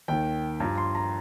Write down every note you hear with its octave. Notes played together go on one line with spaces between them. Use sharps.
D#2 D#3 G5
G2 F3 A#5
C6
A#5